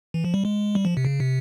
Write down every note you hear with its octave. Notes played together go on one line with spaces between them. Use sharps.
E3
F3
G3
G#3
G3
F3
C3
C#3
C3